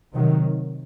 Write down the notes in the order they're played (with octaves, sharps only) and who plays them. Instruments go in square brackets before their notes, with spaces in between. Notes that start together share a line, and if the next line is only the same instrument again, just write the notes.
[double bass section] C3 D#3 F#3